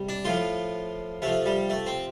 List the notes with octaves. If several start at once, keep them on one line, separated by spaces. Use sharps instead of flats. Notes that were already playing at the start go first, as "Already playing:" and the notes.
Already playing: C3 G3
D4
A2 F3 F4
C3 F3 A3
G3
A3
C4